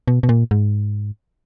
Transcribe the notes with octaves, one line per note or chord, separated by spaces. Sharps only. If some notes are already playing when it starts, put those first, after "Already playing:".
B2
B2
A#2
G#2